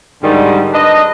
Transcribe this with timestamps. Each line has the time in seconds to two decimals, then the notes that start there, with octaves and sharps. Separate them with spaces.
0.23 G#2 D3 D#3 G3
0.73 D4 B4 D#5